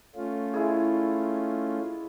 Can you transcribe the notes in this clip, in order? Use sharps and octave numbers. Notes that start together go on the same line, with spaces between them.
A3 C#4 F4
G#3 E4 G#4